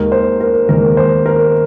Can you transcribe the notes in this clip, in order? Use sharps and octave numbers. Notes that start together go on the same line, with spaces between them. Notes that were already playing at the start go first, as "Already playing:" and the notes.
Already playing: D#2 D#3 G#3 A#4
C5
A#4
D#2 D#3 G#3 A#4
C5
A#4